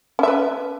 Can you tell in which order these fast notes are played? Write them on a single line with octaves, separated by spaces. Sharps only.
C#4 E5 B4